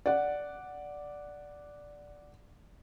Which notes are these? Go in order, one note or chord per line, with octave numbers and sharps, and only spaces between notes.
D5 F#5